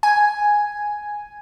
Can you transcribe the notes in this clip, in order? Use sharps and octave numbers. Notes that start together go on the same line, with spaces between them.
G#5